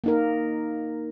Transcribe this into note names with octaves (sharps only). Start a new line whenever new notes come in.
A#3 D#4 A#4